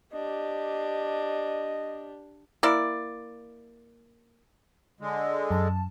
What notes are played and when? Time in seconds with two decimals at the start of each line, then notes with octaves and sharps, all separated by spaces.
0.13 D4 G4 D#5
2.63 A#3 E4 D5
5.00 D3 G#3
5.51 F#2 A5